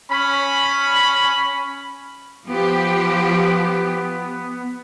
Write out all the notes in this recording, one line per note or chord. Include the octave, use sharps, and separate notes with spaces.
C#4 B5
F3 B3 G4